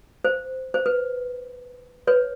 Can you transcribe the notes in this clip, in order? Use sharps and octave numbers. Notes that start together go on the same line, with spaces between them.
C5
C5
B4
B4 C#5